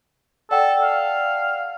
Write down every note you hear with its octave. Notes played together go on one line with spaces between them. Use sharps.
A4 D5 F#5 G5
F5